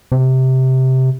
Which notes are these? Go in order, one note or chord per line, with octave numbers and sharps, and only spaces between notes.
C3